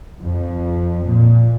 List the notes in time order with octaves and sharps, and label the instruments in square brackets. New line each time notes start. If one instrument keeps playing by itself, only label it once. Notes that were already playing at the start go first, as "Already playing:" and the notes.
[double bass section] F2
A#2